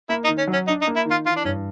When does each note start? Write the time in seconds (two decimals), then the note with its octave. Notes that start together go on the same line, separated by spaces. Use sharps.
0.09 A#3 E4
0.24 D#4
0.28 D#3
0.38 C#4
0.47 F#3
0.53 C#4
0.67 D4 D#4
0.82 D#4
0.87 A#3
0.96 E4
1.06 D#3 F4
1.26 E3 F4
1.36 D4
1.45 G2 C#4